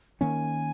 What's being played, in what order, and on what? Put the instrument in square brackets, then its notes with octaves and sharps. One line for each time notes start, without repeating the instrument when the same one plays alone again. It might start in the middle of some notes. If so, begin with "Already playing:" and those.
[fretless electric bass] D#3 A#3 C#4 [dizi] G#5